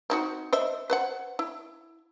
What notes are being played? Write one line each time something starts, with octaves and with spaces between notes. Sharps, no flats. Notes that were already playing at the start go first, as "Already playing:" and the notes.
C4 D#4 F#4
C5 D#5 E5
B4 C5 F#5
E4